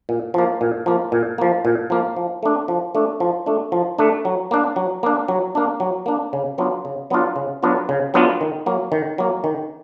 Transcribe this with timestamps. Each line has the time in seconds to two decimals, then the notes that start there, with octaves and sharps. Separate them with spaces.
0.09 A#2
0.34 F3 A#3
0.61 A#2
0.86 F3 A#3
1.12 A#2
1.38 F3 A#3
1.65 A#2
1.90 F3 A#3
2.16 F3
2.43 A3 D4
2.68 F3
2.95 A3 D4
3.20 F3
3.46 A3 D4
3.72 F3
3.98 A3 D4
4.25 F#3
4.51 A#3 D4
4.76 F#3
5.03 A#3 D4
5.28 F#3
5.55 A#3 D4
5.80 F#3
6.06 A#3 D4
6.33 C#3
6.58 F#3 B3 D4 F4
6.85 C#3
7.10 F#3 B3 D4 F4
7.36 C#3
7.63 F#3 B3 D4 F4
7.89 C#3
8.14 F#3 B3 D4 F4
8.41 D#3
8.66 F#3 A#3
8.92 D#3
9.18 F#3 A#3
9.44 D#3